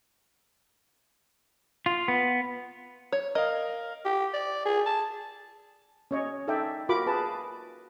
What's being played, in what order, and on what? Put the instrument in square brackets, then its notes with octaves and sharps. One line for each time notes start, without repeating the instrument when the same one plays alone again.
[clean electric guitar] F4
B3
[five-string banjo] C#5
[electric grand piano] A#4 F5 [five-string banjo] D#5
[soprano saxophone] G4
D5
G#4
A5
[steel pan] C#4 C#5 D#5
D#4 A4 D5 E5 G5
F4 F#4 A#4 B5 D6
G#4 B4 A5